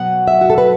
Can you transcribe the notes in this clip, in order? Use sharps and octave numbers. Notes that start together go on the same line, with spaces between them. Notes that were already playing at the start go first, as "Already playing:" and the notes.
Already playing: B2 F#3 B3 F#5
E5
F#4
A4
B4